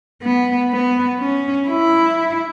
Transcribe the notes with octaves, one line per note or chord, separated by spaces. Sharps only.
B3
B3
C#4
E4